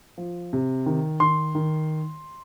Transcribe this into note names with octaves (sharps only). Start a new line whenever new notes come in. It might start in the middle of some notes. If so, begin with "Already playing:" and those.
F3
C3
D#3
D#3 C6
D#3